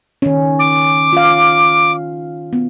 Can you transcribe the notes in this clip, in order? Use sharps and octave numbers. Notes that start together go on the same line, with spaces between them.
D#3 C#4
D6
F4 F5
B3